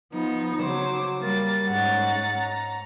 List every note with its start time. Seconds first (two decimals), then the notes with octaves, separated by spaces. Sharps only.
0.12 F3 B3 D#4
0.62 C#3 F#3 C5 D6
1.20 G3 A#3 A6
1.67 G#2 G#3 C#4 F#5 A#5 A6
2.39 A#5